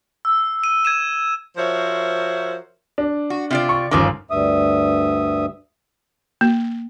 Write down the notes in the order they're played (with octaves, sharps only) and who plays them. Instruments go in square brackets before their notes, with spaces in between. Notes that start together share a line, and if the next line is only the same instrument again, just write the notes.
[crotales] E6
D#7
G#6 D#7 E7
[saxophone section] F3 F#4 A#4 C5 C#5 E5
[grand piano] D4
[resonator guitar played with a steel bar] F#4
C3 F4 D5
[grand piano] C#6
[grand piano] G1 D6 [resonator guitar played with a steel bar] D#3 F3 C#4
[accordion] D2 G2 E5 D#6
[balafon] A#3